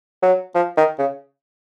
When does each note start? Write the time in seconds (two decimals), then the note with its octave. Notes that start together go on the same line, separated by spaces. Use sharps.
0.22 F#3
0.55 F3
0.77 D#3
0.99 C#3